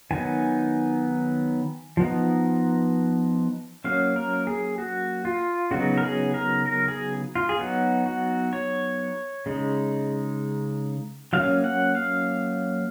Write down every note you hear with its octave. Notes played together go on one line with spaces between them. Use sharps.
D#3 F#3 B3 D#4 G#5
F3 B3 D#4
F#3 A#3 C#4 F5
A#4
G#4
F#4
F4
C#3 F#3 B3 D#4 F#4
A#4
G#4
A#4
A#4
G#4
F4
G#4
F#3 B3 D#4 F#4
F#4
C#5
C#3 G#3 D#4
F#3 A#3 C#4 F5
F#5
F5